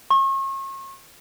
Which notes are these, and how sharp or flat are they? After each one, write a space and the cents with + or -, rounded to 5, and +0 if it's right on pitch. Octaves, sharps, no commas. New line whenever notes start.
C#6 -40